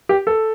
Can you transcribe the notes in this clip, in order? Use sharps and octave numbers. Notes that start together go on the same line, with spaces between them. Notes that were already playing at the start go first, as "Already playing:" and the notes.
G4
A4